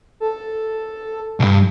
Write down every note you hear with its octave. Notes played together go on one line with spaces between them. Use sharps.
A4
B1 G2